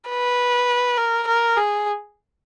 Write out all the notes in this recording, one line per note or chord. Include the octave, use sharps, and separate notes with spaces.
B4
A#4
A#4
G#4